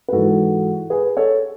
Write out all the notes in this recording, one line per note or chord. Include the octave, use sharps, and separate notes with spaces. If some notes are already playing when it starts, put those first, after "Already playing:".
B4
G#2 E3 F#4 A4
G#4 B4
A4 C#5